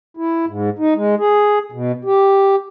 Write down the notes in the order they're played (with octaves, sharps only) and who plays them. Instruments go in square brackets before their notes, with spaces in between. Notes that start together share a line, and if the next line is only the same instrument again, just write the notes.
[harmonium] E4
G#2
D#4
G#3
G#4
B2
G4